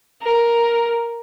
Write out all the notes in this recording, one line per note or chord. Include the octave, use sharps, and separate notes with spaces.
A#4